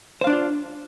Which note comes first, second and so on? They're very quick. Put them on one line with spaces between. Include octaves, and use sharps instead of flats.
C5 F5 D4 D5 F4